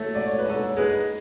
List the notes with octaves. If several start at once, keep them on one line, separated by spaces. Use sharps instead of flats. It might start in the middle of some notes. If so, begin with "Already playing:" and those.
Already playing: A3 A4 C#5
G#2 D5
C#5
B4
G#2 A4 C#5
G#3 G#4 B4